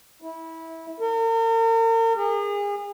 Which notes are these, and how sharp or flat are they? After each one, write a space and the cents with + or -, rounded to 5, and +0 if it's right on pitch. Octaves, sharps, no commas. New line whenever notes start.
E4 -20
A#4 -40
G#4 -35